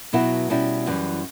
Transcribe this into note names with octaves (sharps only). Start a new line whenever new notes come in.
B2 F#3 B3 E4
B2 G3 C#4 E4
F#2 E3 G3